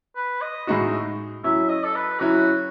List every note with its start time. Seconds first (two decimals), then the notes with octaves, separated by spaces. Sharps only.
0.16 B4
0.41 D#5
0.67 A2 G#3 D#4 F#4
1.44 F#3 C#4 E4 E5
1.69 D#5
1.84 A4
1.95 B4
2.20 F#3 C#4 E4 F#4